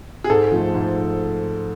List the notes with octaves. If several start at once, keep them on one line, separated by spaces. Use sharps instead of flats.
G#4
G#2 A4
F3 A3
G#2